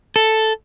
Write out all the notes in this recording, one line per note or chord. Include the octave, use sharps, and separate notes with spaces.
A4